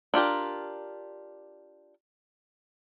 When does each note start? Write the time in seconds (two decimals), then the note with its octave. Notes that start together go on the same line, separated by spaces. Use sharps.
0.14 D4 F4 G4 A#4